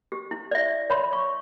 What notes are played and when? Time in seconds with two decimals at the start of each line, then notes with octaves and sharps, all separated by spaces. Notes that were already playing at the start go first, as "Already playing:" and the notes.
0.12 G4
0.31 E4
0.51 D5 E5
0.90 C#5 B5 C6
1.13 C#6